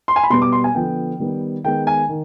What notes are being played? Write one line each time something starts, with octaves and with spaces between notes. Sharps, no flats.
C6
G#5
B5
B2 G3 B3 C6
D6
C6
G#5
D3 F3 B3 G5
D#3 G3 B3
D#3 G#3 B3 G5
G#5
D#3